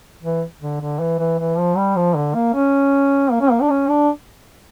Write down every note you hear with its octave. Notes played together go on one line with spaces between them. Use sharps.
E3
D3
D3
E3
E3
E3
F3
G3
F3
D3
A#3
C#4
A#3
C#4
A#3
D4
C#4
D4